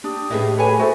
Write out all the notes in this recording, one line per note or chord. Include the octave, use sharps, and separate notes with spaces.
D4 G4 D#6
A2 C#4 E4 G#4 B4 D#5
G#4 A4 B4 C#5 G#5 B5
F#4 A4 C5 E5